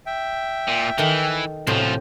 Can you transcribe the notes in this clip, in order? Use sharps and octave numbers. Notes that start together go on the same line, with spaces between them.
E5 G5
A#2
D#3 E3 A4
D2 A2 C3 F3 C5